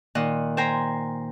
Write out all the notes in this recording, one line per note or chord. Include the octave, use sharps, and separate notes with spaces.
A#2 D#3 D#5 F#5
C5 G5 G#5 A#5